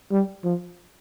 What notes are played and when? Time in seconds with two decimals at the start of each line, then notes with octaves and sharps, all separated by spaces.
0.12 G3
0.44 F3